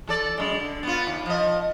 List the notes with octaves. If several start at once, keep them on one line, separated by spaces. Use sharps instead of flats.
E3 A4 D5
F#2 G#3
D3
B3 F4
D#2
F3 D#5